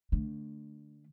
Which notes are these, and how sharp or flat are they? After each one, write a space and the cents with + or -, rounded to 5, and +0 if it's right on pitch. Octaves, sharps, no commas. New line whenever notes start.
D3 +0 A3 +0